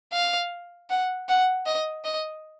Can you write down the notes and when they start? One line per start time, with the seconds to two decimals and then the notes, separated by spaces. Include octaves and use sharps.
0.13 F5
0.90 F#5
1.29 F#5
1.66 D#5
2.05 D#5